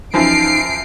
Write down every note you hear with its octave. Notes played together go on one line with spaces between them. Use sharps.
F#2 E3 F3 D#4 C7 D7